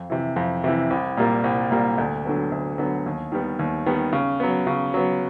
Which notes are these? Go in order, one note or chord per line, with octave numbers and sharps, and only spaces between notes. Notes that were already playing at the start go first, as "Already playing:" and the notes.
Already playing: F2
C3 E3
F2
C3 E3
C2
A#2 G3 A#3
C2
A#2 G3 A#3
D2
D3 F#3 B3
D2
D3 F#3 B3
D#2
D#3 G3 B3
D#2
D#3 G3 B3
C#3
F#3 B3
C#3
F#3 B3